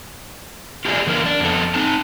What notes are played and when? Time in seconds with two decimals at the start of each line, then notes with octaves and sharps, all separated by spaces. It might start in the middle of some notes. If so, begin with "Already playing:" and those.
0.85 F4 G4 G#4 C5 D5
1.07 D3 E3 G4 A#4
1.26 D4
1.40 F2 B3 A4
1.74 C4 D#4 A5